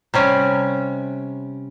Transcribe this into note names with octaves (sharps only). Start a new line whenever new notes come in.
C3 G3 C#4